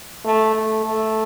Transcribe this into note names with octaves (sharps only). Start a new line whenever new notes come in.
A3
A3
A3